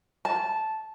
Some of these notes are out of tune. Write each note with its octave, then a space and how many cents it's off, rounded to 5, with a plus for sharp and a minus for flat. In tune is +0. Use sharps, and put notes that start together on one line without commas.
A5 -10